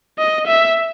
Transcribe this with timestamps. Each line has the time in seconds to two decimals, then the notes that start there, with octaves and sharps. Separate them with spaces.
0.19 D#5
0.47 E5